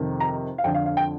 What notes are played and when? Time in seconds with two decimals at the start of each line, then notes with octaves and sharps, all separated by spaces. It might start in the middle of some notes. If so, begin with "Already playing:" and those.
Already playing: F2 C3 D#3
0.20 A#5
0.58 F5
0.64 F2 D3 G5
0.74 F5
0.86 F5
0.97 G5